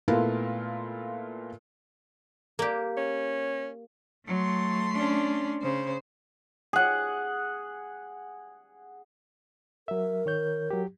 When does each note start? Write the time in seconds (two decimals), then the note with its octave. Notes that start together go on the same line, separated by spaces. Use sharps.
0.08 A#2 A3 B3 E4 F4 A#4
2.59 A#3 G4
2.97 C#4
4.27 F#3 A3 C6
4.94 C#4 D4
5.62 C#3 C5
6.73 G#4 F#5
9.88 F#3 A#4 E5
10.26 D#3 C#5 G6
10.71 F#3 G4